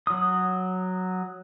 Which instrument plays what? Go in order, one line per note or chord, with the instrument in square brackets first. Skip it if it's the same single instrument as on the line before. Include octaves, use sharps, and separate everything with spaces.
[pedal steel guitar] F#3 D#6